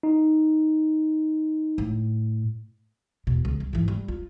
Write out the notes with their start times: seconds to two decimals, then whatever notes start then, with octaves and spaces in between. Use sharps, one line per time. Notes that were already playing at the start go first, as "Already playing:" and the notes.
0.03 D#4
1.78 A2
3.27 E2 B2
3.45 C#2
3.60 G3
3.73 G#2 E3
3.88 G3
4.08 F4